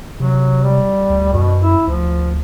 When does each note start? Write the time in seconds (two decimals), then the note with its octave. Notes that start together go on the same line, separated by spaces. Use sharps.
0.20 C3 F#3
0.63 G3
1.10 D2
1.33 F#2 B2
1.63 E4
1.87 D2 F3